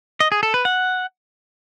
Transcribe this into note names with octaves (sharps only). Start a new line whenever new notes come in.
D#5
G#4
A4
B4
F#5